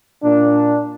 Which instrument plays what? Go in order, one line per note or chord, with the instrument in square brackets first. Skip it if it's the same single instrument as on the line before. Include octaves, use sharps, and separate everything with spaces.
[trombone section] A#2 D4